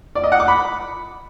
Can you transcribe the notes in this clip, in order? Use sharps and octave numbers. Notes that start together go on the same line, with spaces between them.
D5
D#5
F#5
D6
B5